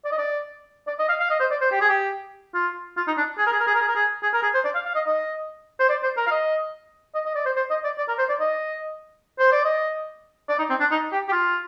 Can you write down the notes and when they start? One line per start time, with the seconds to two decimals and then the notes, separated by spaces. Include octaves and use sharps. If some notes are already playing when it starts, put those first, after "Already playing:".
0.05 D5
0.12 D#5
0.18 D5
0.87 D5
0.99 D#5
1.09 F5
1.20 F5
1.30 D#5
1.40 C5
1.51 D5
1.61 C5
1.71 G4
1.81 G#4
1.89 G4
2.55 F4
2.97 F4
3.07 D#4
3.17 D4
3.38 G#4
3.46 A#4
3.52 G#4
3.60 A#4
3.67 G#4
3.75 A#4
3.81 G#4
3.88 A#4
3.96 G#4
4.23 G#4
4.33 A#4
4.43 G#4
4.54 C5
4.65 D5
4.75 F5
4.85 F5
4.95 D#5
5.06 D#5
5.80 C5
5.89 D5
6.03 C5
6.17 A#4
6.27 F5
6.31 D#5
7.15 D#5
7.25 D#5
7.35 D5
7.45 C5
7.56 C5
7.70 D#5
7.84 D5
7.98 D5
8.08 A#4
8.19 C5
8.29 D5
8.40 D#5
9.39 C5
9.52 D5
9.65 D#5
10.49 D5
10.59 D#4
10.70 C4
10.80 D4
10.91 D#4
11.12 G4
11.28 G4
11.32 F4